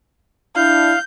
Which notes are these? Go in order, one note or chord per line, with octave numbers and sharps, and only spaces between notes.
D4 E4 F5 G6